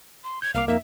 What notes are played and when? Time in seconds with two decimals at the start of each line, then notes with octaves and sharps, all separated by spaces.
0.24 C6
0.42 G6 G#6
0.54 C2 A#3 F5 D6
0.68 F2 A#3 D#4 E5